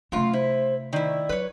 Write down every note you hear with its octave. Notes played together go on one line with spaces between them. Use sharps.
F#2 C3 A3 F4
E4 C5
D#3 E4 D5
F#3 B4 C#5